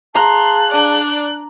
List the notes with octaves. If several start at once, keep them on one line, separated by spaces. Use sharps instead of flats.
G#4 F5 A5 A#5 C6 F#6
D4 D5